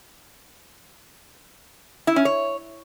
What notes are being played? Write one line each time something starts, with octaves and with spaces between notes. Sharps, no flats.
E4
C#4
C#5